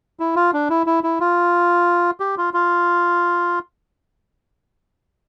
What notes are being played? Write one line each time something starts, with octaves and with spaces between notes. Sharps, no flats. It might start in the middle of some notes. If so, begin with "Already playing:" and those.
E4
F4
D4
E4
E4
E4
F4
G4
F4
F4